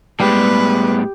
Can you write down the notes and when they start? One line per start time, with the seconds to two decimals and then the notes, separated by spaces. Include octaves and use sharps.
0.20 A2 G3 G#3 B3 G4 B4